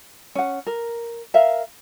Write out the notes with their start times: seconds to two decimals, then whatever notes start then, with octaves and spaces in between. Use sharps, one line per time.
0.35 C#4 F#5
0.66 A#4
1.34 A#4 E5 F5